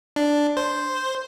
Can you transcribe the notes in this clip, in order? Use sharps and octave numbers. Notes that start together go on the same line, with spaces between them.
D4
C5